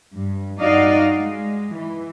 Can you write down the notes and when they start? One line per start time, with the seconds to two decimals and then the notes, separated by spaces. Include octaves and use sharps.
0.15 G2
0.60 G2 D#4 F#4 D5 D#5 F5
1.16 G#3
1.74 E3